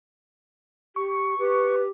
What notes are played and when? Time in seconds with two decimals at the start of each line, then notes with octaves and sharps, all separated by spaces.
0.96 G4 C#6
1.39 G4 B4